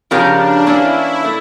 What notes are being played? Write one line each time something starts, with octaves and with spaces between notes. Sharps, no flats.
C#3 F3 C#4 D4 G4 A#4
E3 A#3 C#4 E4
A3 E4